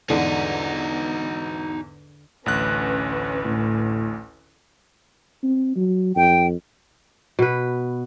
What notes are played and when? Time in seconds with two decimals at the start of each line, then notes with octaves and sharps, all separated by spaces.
0.10 E2 G#2 D3 D#4 F#4
2.46 A1 D2 C#4 B4 F#6
3.45 A2
5.43 C4
5.76 F#3
6.16 F2 G5
7.39 B2 B4